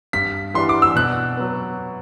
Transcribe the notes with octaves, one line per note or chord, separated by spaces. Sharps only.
G2 B6
E3 G3 D4 C6
D6
E6
B2 F#6
F#3 B3